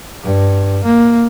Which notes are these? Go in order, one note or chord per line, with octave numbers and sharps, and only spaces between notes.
G2
A#3